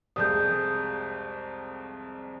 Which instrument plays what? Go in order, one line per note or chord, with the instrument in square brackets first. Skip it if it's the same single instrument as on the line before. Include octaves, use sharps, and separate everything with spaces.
[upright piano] C2 F2 G#3 [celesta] D#6 G6